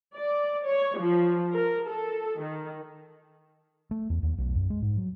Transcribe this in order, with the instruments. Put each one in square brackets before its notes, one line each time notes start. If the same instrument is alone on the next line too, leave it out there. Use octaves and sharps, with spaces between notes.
[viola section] D5
C#5
F3
A#4
A4
D#3
[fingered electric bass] A3
E2
D#2
B1
F#2
G#3
G#2
F#3